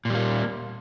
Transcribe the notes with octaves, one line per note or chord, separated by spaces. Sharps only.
A#2 G3 A#3